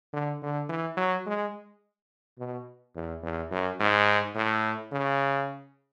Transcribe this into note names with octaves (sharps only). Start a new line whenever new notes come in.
D3
D3
E3
F#3
G#3
B2
E2
E2
F#2
G#2
A2
C#3